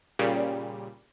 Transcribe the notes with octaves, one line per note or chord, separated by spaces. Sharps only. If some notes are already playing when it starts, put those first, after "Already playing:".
A#2 C#3 G3